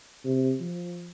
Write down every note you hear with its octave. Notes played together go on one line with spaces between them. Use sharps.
C3
F3